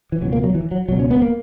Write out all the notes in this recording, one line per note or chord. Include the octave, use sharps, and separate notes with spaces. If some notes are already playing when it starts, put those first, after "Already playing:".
E3
C#2 B2 F#3
A#3
F#3
E3
F#3
C#2 B2 F#3
C#4
B3
A#3